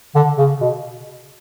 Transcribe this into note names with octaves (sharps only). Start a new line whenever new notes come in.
D3
C#3
B2